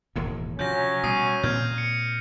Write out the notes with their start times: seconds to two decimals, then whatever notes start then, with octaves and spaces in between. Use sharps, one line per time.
0.16 E1 D#2 A2
0.59 C3 F3 F#3 C#4 G6 A#6
1.04 B2 G3 D#6 C7 D#7
1.43 A#2 C4 F6 G6 G#6
1.78 C#7